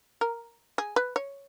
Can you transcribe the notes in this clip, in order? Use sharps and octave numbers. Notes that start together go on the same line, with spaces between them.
A#4
G#4
B4
C#5